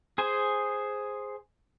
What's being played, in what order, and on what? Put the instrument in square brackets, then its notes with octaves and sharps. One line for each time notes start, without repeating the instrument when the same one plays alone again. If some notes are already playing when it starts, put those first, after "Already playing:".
[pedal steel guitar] G#4 C5 G#5